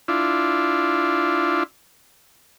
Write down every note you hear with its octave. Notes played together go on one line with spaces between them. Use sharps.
D4 E4 F4